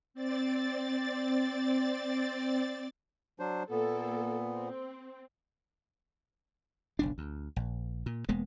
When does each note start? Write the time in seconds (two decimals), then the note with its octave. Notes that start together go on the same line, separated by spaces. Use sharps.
0.14 C4 D5 A6
3.40 F#3 D4 C5
3.71 A#2 A#3 B3 A4
4.52 C4
6.99 F#1 B1 D4
7.18 D2
7.56 A#1
8.06 A#2
8.29 E1 G#3 A#3 B3